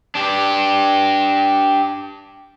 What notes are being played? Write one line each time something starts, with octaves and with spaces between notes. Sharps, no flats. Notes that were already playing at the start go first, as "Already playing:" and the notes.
D4 G4